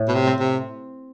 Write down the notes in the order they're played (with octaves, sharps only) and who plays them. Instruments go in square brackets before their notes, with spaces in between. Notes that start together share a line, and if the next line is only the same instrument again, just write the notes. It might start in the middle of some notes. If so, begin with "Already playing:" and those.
Already playing: [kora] A2
[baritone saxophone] B2
C3
[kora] C4
[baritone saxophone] C3